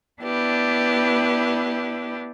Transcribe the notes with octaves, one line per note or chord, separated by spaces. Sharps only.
B3 D4 E4 G4 B4